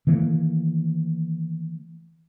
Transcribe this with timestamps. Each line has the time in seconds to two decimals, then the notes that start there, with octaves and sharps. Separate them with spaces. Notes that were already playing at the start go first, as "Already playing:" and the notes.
0.07 D#3 E3 A3 A#3